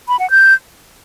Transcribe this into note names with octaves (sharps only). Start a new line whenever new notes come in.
B5
F#5
G6